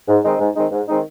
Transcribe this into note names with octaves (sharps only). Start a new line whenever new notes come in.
G#2
D#3 G#3 C4 D#4
G#2
D#3 G#3 C4 D#4
G#2
D#3 G#3 C4 D#4